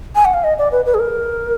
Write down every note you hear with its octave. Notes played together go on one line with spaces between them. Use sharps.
G#5
F#5
F5
D#5
D5
B4
B4
G#4
A#4